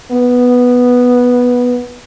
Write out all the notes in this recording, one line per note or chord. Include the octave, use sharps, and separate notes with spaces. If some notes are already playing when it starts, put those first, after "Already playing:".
B3